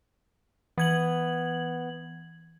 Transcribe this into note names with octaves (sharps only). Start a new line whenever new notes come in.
E3 B3 G#6 F#7